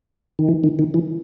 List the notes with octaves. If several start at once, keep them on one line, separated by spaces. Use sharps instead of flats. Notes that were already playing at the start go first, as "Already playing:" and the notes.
D#3
E3
D#3
D#3
E3